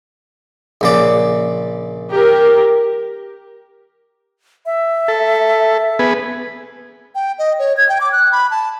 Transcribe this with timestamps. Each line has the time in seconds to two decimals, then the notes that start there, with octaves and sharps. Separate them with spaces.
0.81 A#1 C#3 D5
2.10 G4 A#4
4.66 E5
5.08 A4
5.99 B3 G#4 B4
7.15 G5
7.39 D#5
7.59 C#5
7.77 G#6
7.89 G5
8.01 D6
8.12 F#6
8.32 B5
8.51 A5